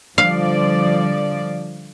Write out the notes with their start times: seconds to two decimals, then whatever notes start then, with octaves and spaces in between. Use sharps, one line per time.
0.18 D3 F3 G3 D5 F5